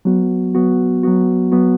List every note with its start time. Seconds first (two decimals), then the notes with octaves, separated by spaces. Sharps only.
0.05 F#3 B3 F#4
0.55 F#3 B3 F#4
1.03 F#3 B3 F#4
1.52 F#3 B3 F#4